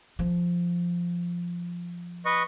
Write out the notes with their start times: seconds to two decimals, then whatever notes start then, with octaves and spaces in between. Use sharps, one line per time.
0.19 F3
2.25 B4 D#5 C#6